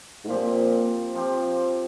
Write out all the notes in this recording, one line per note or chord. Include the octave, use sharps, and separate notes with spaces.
G#2
A#2 F3 C4 G4
F3 C4 G4